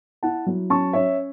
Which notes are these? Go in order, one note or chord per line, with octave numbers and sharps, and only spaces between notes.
E4 F#5 A5
F#3
C#4 A5 C#6
C#4 C#5 E5